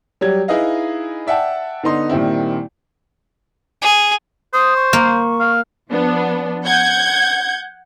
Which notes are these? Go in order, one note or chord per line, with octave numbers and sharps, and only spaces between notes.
F#3 G3 G4 G#6
D#4 E4 G#4 B4 D#5 F5
D5 E5 F#5 G5 A5
D3 B3 D#4 C6
A#2 D#3 G3 C4 E4
G#4
C5 D#6
C#6
A#3
F5
F3 B3 D4
F#5 G6 G#6